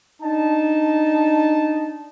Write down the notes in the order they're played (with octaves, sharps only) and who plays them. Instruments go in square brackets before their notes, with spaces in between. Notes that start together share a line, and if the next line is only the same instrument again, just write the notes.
[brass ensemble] D4 D#4 A5